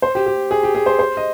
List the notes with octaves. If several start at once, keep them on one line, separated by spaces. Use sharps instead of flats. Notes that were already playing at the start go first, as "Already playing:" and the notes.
C5
G4
G4
G#4
G4
G#4
C5
C5
D#5